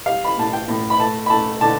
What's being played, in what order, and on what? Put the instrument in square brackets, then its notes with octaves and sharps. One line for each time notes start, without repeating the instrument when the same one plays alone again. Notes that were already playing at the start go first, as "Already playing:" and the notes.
[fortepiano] G3 F5
B5
A2 A5
G5
A2
B5
A3 A5
B5
A3 A5
D3 A5